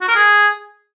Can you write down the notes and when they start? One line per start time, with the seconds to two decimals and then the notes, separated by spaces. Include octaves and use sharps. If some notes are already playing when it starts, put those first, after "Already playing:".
0.01 F#4
0.08 A#4
0.15 G#4